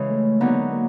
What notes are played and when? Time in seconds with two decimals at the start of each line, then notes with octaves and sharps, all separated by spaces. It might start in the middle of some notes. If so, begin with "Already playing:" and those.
Already playing: C#3 E3 G#3
0.10 A3
0.40 D3 F#3 A#3 B3 D#4
0.71 A#3